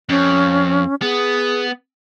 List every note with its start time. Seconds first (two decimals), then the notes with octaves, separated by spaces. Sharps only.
0.09 F2 C#4
1.02 B3 G#4